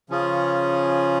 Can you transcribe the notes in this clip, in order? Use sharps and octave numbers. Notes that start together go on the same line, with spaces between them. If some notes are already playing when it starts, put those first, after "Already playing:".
C#3 F3 C#4 F4 G#4